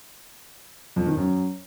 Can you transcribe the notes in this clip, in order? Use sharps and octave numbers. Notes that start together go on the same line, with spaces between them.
F2
D#3
F#2